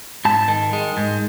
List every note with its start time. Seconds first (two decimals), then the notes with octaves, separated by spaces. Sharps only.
0.25 G#2 A5
0.48 D#3
0.73 G#3
0.97 G#2